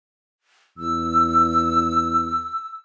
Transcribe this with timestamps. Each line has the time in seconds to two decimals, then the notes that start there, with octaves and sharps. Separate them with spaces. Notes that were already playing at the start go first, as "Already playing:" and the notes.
0.78 E2 E6